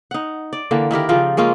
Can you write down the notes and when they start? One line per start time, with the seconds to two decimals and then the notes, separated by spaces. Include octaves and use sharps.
0.11 D#4 F#5
0.53 D5
0.71 D3 E3 A#3
0.91 D#3 E4 G4 A#4
1.09 C#3 F3 F4 G5
1.37 G#3 A#3 C#4 F4